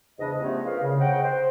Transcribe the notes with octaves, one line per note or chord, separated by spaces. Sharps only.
E2 G#2 C#3 D4 D#5
F3 G3 A3 B3 C#4 F4
D4 F4 G#4 A#4 B4 F5
C#3
C5 C#5 D#5 F#5 G5
C5